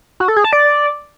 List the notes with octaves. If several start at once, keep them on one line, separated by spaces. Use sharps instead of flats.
F#4
A4
G#4
A5
D5